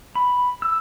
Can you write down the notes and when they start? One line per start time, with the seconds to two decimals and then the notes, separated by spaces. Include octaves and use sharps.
0.15 B5
0.62 E6